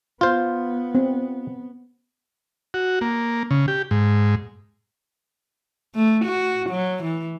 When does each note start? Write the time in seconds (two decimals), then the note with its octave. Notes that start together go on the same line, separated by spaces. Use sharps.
0.21 B3 F4 C5
0.95 C4
2.74 F#4
3.01 A#3
3.51 C#3
3.68 G4
3.91 G#2
5.95 A3
6.25 F#4
6.70 F#3
7.03 E3